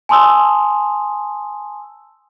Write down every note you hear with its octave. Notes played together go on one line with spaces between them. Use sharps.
G#5 A5 C6 D#6 E6